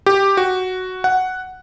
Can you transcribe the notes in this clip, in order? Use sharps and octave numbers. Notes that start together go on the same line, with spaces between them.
G4
F#4
F#5